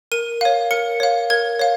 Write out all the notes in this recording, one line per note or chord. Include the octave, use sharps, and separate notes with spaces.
A#4 D#7
C#5 F5
A#4 C#7
C#5 F5
A#4 G#6
C#5 F5